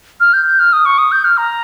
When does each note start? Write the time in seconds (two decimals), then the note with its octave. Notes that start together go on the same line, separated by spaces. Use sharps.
0.20 F6
0.33 G6
0.46 G6
0.59 F6
0.73 D#6
0.86 C#6
0.98 D#6
1.12 G6
1.25 F6
1.37 A#5